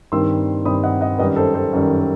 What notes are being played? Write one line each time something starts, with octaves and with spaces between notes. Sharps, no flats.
G2 D#3 G3 C4 D#4 C6 E6
G2 D#3 G3 C4 D#4 B5 D#6
D#5 F#5
D#5 F#5
F#2 D#3 G3 B4 D#5
A4 C5
A4 C5
F#2 D#3 G3